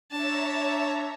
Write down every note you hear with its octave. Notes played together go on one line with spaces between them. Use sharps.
D4 C#5 E5 A5 A#5